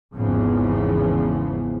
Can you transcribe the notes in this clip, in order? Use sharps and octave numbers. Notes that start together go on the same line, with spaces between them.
G#1 E2 C#3 E3 F3 B3